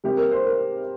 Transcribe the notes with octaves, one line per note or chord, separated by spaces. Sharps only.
C3 G3 A#3 G4
A#4
C5
A#4